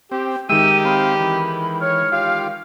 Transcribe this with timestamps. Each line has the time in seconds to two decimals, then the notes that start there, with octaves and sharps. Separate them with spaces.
0.11 C4 G4
0.49 D#3 G#3 D#4 G4 E5 G5 E6 D#7
0.85 C4 F5 B5
1.20 E3
1.81 C#5 F6
2.12 F4 G4 F5